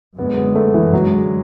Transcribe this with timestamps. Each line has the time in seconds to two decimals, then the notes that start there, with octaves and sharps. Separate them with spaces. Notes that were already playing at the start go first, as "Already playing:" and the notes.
0.17 F#2 D3 G#3 B3
0.37 B3
0.55 A3
0.74 E3
0.93 F#2 D3 F#3 G#3